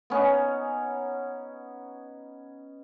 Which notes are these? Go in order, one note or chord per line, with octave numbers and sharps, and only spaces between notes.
B3 C#4 D#4